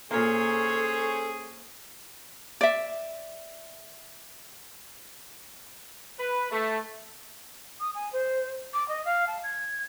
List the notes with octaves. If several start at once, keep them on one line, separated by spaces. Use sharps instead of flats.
A#2 A#3 C#4 G#4 A4 C5 C#5
D5 E5
B4
A3
D#6
G#5
C5
D6
D#5
F5
A5
G#6